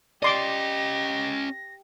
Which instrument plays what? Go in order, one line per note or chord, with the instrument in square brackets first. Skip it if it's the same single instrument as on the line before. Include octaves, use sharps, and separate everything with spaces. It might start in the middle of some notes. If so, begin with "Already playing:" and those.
[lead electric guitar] C#4 D#5 [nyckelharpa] G4 [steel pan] D5 C6 D6 [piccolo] A#6